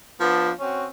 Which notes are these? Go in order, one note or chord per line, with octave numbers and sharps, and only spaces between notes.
F3 B3 D4
C4 C#4 F#4